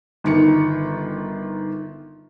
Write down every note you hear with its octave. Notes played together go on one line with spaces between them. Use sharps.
G1 D#3 C#7